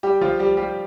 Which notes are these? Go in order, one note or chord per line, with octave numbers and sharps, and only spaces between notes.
G3 G4
F3 F4
G3 G4
G3 G4